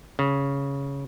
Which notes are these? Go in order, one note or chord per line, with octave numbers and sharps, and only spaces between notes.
C#3